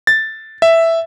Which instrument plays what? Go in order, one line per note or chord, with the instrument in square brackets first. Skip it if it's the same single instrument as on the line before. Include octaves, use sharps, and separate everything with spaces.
[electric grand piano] A6
E5